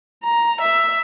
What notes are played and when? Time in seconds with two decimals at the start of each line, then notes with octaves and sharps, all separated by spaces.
0.24 A#5
0.61 E5